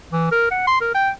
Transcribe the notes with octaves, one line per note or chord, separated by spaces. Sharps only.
E3
A#4
F#5
C6
A#4
G5